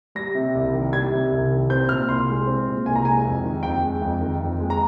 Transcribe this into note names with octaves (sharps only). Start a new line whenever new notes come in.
G3 A#6
C3
C2
D#3
G3 G#6
C3
C2
D#3
C4 G6
A#2 F6
C2 C6
G#3
C4
A#2
C2 G#5
A#5
G#3 G#5
F2
D#3
F2 G5
G#3
F2
D#3
F2
G#3
A#5